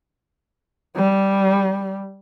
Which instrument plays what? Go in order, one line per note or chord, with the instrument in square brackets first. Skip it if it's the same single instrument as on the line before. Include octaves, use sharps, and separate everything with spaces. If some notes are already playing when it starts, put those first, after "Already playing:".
[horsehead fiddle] G3